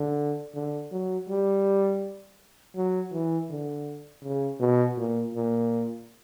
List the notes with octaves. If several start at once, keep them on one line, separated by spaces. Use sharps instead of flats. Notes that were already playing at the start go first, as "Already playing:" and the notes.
Already playing: D3
D3
F#3
G3
F#3
E3
D3
C#3
B2
A#2
A#2